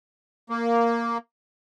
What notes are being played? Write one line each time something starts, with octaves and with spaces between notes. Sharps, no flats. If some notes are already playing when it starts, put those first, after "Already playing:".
A#3